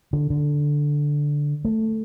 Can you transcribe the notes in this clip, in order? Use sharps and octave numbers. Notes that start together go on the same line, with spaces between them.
D3
D3
A3